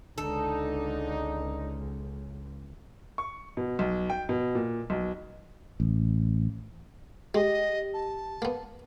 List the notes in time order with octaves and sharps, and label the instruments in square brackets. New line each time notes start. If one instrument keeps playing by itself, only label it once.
[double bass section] C#2 [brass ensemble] D3 D4 D#4 [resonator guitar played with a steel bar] A4
[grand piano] C#6
B2
B1
G5
B2
A#2
B1
[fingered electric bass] A1
[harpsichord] G#3 [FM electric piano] G4 [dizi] D#5
[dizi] A5
[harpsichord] A#3 B3